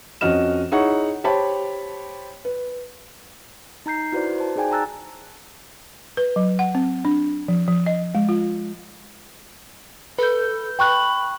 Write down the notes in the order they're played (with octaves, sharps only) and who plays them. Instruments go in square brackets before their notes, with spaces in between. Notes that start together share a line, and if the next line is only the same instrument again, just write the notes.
[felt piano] F2 C#4 F#4 D#5 F6 E7
D#4 E4 G#4 C#5 F#5 C#6
G4 C5 C#5 G5 A5 B5
B4
[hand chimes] D#4 A#5 G6 C7
E4 F#4 B4 C5 D5
C5 A5
D#4 G#4 D5 G5 G#5
A5 A#5 E6 F#6 A6
[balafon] B4
F#3
F#5
C4
D4
F3
F3
D#5
G#3
F4
[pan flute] A4 [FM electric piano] B4 G6
[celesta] G5 C#6 F#6 [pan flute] B5